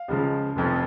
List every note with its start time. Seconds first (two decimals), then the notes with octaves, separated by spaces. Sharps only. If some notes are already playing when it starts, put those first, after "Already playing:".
Already playing: F5
0.08 C#2 C#3 F3 G#3
0.56 F1 F2 F3